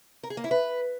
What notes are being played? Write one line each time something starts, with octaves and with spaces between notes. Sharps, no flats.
A#4
G#4
A#3
E4
B4